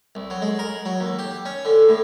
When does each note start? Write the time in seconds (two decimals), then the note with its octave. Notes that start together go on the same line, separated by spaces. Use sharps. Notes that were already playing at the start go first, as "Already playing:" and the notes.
0.15 C2
0.30 F#3
0.42 G#3
0.59 A#4
0.85 F#3
1.00 D#2
1.19 G4
1.45 C#4
1.65 D3
1.89 A2